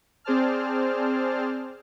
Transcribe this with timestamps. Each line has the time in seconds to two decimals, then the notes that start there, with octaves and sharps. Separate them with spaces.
0.24 C4 G#4 C5 D5 A5 F6